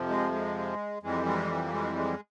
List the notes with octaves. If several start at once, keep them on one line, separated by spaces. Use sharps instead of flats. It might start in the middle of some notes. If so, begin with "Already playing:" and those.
Already playing: F2 C3 F3
G#3
G#3
F2 E3 G3 G#3
G#3
A#3
G#3
G#3